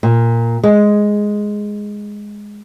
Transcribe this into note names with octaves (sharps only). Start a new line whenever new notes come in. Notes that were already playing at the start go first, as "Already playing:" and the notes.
A#2
G#3